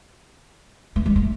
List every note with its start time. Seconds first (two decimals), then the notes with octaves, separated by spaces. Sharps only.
0.96 A3
1.06 G#3
1.16 A3